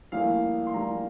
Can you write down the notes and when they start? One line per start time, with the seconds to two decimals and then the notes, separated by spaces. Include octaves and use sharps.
0.12 A#1 A2 G3 A#3 F5
0.67 C6
0.74 A#1 A2 G3 A#3 A#5